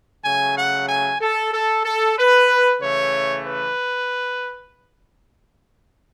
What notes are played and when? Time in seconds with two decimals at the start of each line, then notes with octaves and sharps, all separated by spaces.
0.23 C#3 F#3 A3 G#5
0.56 F#5
0.88 G#5
1.20 A4
1.53 A4
1.84 A4
2.17 B4
2.81 C#3 E3 A3 C#5
3.46 B4